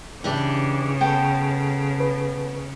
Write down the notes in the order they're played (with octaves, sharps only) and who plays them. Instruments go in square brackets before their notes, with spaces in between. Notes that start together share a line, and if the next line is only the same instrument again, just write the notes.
[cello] C#3 [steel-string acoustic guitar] E3 D4 G4
[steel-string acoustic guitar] B3 A4 [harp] G5
[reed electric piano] B4